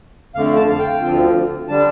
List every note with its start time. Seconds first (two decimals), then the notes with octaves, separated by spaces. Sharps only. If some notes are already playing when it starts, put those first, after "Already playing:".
0.35 F2 D3 A3 F5
0.56 A5
0.69 F5
0.79 G5
1.01 D2 D3 F3 C4 F4
1.69 D3 G3 D4 A5